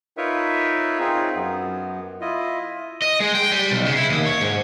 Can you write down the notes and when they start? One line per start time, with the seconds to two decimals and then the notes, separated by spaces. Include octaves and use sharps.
0.17 D#4 F4 A#4 B4 C#5 E5
0.99 C4 D#4 F4 G#4
1.35 F#2 B3
2.21 E4 F4 D#5
3.02 D#5
3.20 G#3
3.35 G5
3.52 G3
3.71 B1
3.86 C#3
3.97 E4
4.09 D#2
4.26 C#5
4.41 G#2